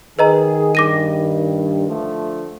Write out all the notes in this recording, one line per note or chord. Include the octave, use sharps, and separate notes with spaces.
D#3 G#4 B4 D#5 A#5
G2 D6 A#6 D#7
D3 F3 A3